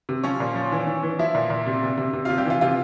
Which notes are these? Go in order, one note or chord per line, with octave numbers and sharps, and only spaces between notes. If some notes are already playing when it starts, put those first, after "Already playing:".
C3
F3 C#4 C#5
A#2
F3
E3
E3
E3
F3 E4 E5
A#2
A#2
C3
C3
C3
C3
C3 F4 F5
G3 G4
E3 F4
C3 F4